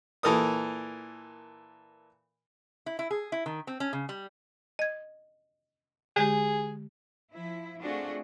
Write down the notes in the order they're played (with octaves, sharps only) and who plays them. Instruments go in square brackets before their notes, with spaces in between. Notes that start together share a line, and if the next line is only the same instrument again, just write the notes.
[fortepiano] A#2 E3 A4 A#4 D#6
[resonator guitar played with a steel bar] E4
E4
G#4
E4
D#3
C4
C#4
C#3
G3
[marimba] D#5 G#6
[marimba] D3 G#3 G4 [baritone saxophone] G#4
[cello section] F3 E4
A3 C4 D4 F4 F#4 G#4